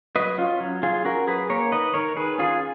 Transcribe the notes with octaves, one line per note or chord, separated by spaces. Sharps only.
F#3 B4 D#5
C#4 F4
F#3
F#3 F4 G#4
C#4 F#4 A#4
F#3 G#4 B4
A#3 A#4 C#5
D#3 B4 D#5
D#3 A#4 C#5
D#3 G#4 B4
C#4 F4 G#4